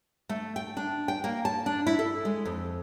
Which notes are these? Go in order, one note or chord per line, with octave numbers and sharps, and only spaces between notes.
A3
G5
D4
G5
A#3
A5
D4
E4
A4
G#3
F2